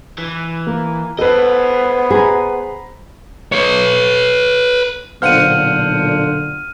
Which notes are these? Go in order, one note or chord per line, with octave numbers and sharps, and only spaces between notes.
E3
A#3
B3 A4 B4 C5 D#5
G#4 A#5 B5
B4 C#5
B1 A#2 D3 C5 F5 F#5 F6 D#7